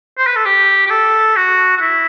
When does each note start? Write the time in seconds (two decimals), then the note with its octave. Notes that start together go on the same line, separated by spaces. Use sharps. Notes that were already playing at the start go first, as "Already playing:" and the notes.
0.18 C5
0.27 B4
0.36 A4
0.45 G4
0.86 G4
0.90 A4
1.36 F#4
1.77 F#4
1.81 E4